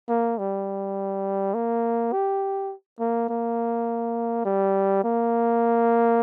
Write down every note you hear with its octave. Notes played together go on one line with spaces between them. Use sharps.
A#3
G3
A#3
G4
A#3
A#3
G3
A#3